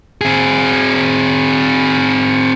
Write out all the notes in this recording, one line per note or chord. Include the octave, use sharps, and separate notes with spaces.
C4 G#4